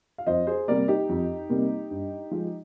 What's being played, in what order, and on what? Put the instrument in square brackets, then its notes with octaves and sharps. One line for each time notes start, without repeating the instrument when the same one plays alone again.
[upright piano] F5
F2 C5 D#5
G#4 C5
C3 G3 A#3 A#4 D5
D#4 G4
F2
C3 G3 A#3
G2
F3 G#3